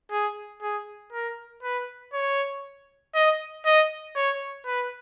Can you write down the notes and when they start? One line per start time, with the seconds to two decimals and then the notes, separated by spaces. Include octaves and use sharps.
0.11 G#4
0.62 G#4
1.12 A#4
1.63 B4
2.13 C#5
3.14 D#5
3.65 D#5
4.16 C#5
4.66 B4